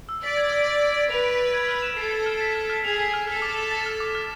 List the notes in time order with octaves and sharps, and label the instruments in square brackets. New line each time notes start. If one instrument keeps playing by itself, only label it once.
[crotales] E6
[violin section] D5 [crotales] B6
[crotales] G#6
E6
D7
A6
A6
[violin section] B4 [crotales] F7
[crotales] D7
A6
G#6
F6
E7
[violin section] A4 [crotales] C7
[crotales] G#6
F6
B6
F6
F6
[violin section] G#4 [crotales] F7
[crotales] B6
F6
[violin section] A4 [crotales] F6
[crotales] D6
E7
A6
F6
D6
F6